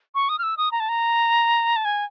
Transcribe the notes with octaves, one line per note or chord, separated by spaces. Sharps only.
C#6
D#6
F6
E6
D#6
A#5
A5
A#5
A5
G#5